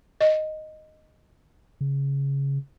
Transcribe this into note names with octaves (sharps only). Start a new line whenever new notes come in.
D#5
C#3